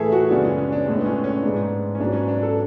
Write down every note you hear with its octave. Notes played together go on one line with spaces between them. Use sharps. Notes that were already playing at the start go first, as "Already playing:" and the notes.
Already playing: A2 E3 A3 G#4 A4 E5
F#4
F#2 C#3 G#3 B3 D4
C#4
C#4
D4
A2 G#3 B3 D4
D4
C#4
C#4
G#2 G#3 B3 D4
C#4
G#2 F#3 B3 D4
C#4
D4
A4